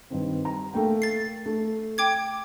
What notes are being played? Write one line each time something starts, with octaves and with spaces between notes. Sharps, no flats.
G2 D#3 C4
A#5
A3 A#3 G5
A6 C7
A3
G5 D6 G#6